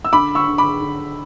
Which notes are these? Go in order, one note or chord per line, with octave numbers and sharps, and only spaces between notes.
E6
D3 B5 D6
C#6 E6
D3
B5 D6
D3